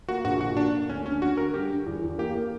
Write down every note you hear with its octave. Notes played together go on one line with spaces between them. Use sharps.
A#3 F#4
A#1 F#4
A#2 F#4
A#3 D4
D3
D2 C#4
D3 C#4
D3 F#4
D3 A#4
G2 G4
G2
E2
E2
A#3 G4
A#3